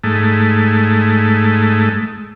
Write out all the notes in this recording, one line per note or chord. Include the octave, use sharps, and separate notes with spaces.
G#2 A3